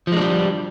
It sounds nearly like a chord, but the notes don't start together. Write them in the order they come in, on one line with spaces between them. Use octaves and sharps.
F3 G#3 D4 G3